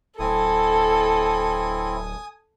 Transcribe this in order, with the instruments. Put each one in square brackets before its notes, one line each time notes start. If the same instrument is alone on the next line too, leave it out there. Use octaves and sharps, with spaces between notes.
[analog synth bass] D1 [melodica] C4 E4 [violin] A4 [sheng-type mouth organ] G#5 D#6